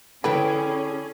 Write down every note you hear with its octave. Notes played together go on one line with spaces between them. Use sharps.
D3 C#4 E4 G#4 A4 B4 G5